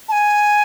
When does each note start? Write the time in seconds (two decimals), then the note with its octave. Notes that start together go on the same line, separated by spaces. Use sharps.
0.09 A5
0.12 G#5